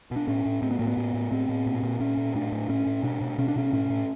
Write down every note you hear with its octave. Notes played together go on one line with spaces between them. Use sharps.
B2
D4
A2 C#4
A2
A2 C4
B3
A2 A#3
B3
A2
A2
A2 C4
A2
A#2
A#2
A#2 C#4
A#2
A2 D4
A2
A2 C#4
A2
B2 D4
B2
B2 C#4
D4
B2 C#4
A2 C#4
A2